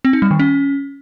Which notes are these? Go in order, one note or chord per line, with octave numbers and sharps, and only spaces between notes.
C4
D#4
G3
D#3
C#4